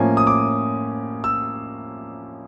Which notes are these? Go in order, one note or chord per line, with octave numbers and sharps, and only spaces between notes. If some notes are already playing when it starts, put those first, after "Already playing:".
Already playing: A2 F3 A#3 C#4 G#5
D#6
D6
E6